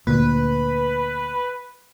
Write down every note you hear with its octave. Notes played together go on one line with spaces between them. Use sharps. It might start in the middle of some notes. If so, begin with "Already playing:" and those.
D2 A#2 B4